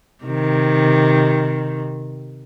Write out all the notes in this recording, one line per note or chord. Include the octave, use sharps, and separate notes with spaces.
C3 D#3